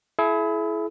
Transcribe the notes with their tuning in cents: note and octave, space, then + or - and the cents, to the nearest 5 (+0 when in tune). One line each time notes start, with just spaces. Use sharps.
E4 +15 G#4 +45